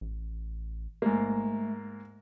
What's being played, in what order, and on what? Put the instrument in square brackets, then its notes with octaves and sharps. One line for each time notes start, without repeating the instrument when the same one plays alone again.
[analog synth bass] A1
[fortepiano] G#2 A#3 [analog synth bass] A3